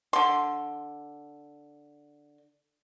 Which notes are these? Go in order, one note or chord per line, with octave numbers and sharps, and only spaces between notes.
D3 C6